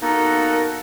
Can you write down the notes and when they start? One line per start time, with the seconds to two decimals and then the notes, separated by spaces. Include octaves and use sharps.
0.02 A#3 B3 D#4 F#4 A4 A#4